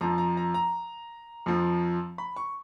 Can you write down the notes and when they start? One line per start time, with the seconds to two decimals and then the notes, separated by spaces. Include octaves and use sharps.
0.01 F2 F3 A#5
0.18 A#5
0.37 A#5
0.54 A#5
1.46 F2 F3
2.18 B5
2.36 C#6